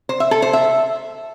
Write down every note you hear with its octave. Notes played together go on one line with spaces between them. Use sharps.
C5
E5
A4
C5
E5